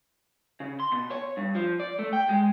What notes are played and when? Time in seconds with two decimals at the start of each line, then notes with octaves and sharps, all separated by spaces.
0.60 C#3
0.80 C6
0.92 B2
1.11 C#5
1.37 G2
1.55 F3
1.80 D5
1.99 A3
2.13 G5
2.29 G#3